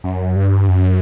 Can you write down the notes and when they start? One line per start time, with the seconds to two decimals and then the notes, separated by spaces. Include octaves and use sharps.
0.04 F#2
0.36 G2
0.68 F#2